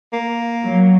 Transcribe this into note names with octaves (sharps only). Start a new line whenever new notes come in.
A#3
F#3